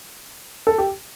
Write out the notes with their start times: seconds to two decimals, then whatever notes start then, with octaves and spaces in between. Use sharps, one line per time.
0.67 A4
0.78 G4